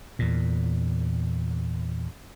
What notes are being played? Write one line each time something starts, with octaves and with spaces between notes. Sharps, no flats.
E2 A#2